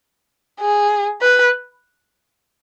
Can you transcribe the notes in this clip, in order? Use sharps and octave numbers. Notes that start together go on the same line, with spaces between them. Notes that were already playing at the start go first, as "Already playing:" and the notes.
G#4
B4